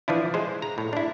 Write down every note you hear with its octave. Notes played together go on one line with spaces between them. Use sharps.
E3 F3 D4 E4
G#3 C5
A#5
A2
D4 E4